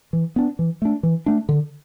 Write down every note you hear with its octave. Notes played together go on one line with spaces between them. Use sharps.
E3
B3 D4
E3
A3 D4
E3
A3 D4
D3